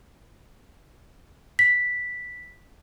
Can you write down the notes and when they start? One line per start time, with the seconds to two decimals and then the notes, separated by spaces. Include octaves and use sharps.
1.59 B6